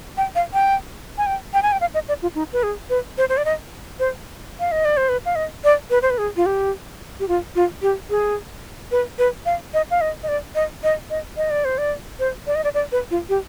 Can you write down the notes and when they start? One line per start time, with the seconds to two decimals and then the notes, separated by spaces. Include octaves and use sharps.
0.17 G5
0.35 F5
0.54 G5
1.18 G#5
1.26 G5
1.54 G5
1.62 G#5
1.72 G5
1.81 F5
1.94 D#5
2.08 D5
2.22 F4
2.35 D#4
2.53 B4
2.63 G#4
2.90 B4
3.18 C5
3.29 C5
3.37 D5
3.45 D#5
4.00 C5
4.60 F5
4.72 D#5
4.85 D5
4.97 C5
5.09 B4
5.25 F5
5.36 D#5
5.64 D5
5.90 B4
6.02 C5
6.10 B4
6.18 G#4
6.36 F4
6.46 G4
7.20 G4
7.28 F4
7.55 F4
7.82 G4
8.10 G#4
8.91 B4
9.18 B4
9.46 F5
9.74 D#5
9.91 F5
10.01 D#5
10.23 D#5
10.28 D5
10.55 D#5
10.83 D#5
11.10 D#5
11.37 D#5
11.50 D5
11.65 C5
11.78 D5
12.19 C5
12.47 D5
12.55 D#5
12.64 D5
12.74 D5
12.92 B4
13.11 F4
13.29 G4